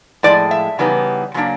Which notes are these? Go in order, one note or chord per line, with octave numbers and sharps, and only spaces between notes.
A2 F3 G#3 D5
E5
C#3 E3 G3 B3 D#4
C#3 F#3 A#3 D4